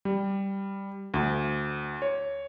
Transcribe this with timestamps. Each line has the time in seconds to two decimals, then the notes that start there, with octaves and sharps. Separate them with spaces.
0.05 G3
1.14 D2
2.02 C#5